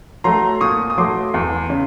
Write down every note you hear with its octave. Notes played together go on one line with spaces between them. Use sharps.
F#3 A3 A#5 C6
A#2 C#6 D#6
D#6
F#3 A3 C6 D6
E2
C#3